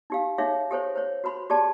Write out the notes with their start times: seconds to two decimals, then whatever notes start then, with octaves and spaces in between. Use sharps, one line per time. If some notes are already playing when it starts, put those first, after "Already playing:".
0.10 D#4 G4 F5
0.38 D#4 G#4 C#5 E5 F5
0.71 G4 A4 C5 C#5
0.96 C5 C#5
1.24 F#4 B4 B5 C6
1.50 G4 G#4 D5 A5